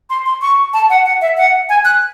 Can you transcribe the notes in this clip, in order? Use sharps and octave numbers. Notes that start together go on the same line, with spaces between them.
C6
C6
C#6
A5
F#5
F#5
E5
F#5
G#5
F#6